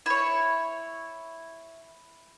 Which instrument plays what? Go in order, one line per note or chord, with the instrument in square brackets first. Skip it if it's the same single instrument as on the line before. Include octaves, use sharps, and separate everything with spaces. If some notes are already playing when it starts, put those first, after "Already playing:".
[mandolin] E4 C#5